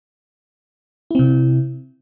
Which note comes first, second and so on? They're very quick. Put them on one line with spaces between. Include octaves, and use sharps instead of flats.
E4 C4 C3